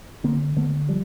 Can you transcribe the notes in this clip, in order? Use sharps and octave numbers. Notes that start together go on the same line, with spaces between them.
D3 A#3 C4
D3 A3 B3
F3 G3